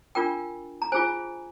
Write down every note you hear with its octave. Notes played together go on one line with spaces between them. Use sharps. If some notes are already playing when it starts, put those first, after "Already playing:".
D4 F4 A#4 G5
A#5
F4 G#4 C5 G#5